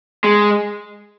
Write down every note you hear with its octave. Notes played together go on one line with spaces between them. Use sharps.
G#3